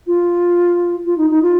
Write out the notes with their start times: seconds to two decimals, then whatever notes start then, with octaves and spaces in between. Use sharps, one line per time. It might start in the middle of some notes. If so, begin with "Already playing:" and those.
0.07 F4
1.05 F4
1.17 D#4
1.30 D#4
1.42 F4